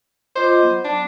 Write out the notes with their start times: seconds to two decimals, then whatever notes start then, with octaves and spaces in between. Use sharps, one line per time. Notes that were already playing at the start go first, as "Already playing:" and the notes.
0.36 F4 C5 D#5 D6
0.62 F#3 B3
0.84 D4